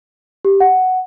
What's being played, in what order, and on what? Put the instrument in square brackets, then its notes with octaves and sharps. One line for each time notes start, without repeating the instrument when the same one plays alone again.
[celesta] G4
F#5